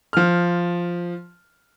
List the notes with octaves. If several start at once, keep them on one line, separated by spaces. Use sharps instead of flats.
F3 F6